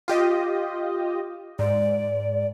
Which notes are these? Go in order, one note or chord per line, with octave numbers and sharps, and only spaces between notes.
F4 G4 D#5
G#2 D5